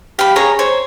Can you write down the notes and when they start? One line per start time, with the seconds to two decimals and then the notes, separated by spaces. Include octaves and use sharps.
0.19 G4 F5 B5
0.36 G#4 C#5 A#5
0.59 C5 C#5